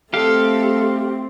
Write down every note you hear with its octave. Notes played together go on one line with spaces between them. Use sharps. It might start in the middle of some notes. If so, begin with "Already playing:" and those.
A3 C4 G4 A4 F5